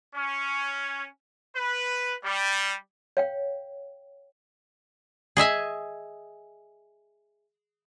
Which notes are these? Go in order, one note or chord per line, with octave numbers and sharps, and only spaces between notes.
C#4
B4
G3
C#5 F5 G5
G#4 D#5 E5 G#5